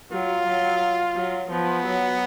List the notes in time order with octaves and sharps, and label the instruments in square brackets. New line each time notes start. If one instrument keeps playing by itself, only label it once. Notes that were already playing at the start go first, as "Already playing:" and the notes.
[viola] F#3 [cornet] F4
[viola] F#3
F#3
[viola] F3 [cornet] B3
[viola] F#3